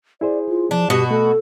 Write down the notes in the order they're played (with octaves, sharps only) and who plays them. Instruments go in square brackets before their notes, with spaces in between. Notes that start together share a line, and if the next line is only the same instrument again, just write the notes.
[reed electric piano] E4 G#4 C5 [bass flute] D5
[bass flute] F4
[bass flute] F3 [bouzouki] D4
[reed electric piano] G2 D#6 [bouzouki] B2 F#4 [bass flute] G4
[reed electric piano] A3 [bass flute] A4